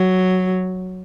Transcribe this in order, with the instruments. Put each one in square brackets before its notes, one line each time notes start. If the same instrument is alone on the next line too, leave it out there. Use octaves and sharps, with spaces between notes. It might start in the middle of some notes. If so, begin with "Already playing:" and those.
Already playing: [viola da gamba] F#3